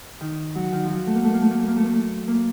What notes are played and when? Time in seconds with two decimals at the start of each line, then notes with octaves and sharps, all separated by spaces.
0.21 D#3
0.55 F#3
0.72 D#3
0.84 F3
0.89 F#3
1.07 A3
1.15 A#3
1.25 A3
1.34 A#3
1.42 A3
1.51 A#3
1.59 A3
1.67 A#3
1.77 A3
1.86 A#3
1.94 A3
2.28 A#3